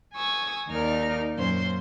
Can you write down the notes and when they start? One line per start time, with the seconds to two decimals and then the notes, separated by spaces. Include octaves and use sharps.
0.15 G#5 C#6 D#6 E6
0.70 D#2 D#4 A#4 D5 F6
1.37 F#2 A#2 C#4 C5 C6